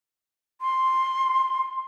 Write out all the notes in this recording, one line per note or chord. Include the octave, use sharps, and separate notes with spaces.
C6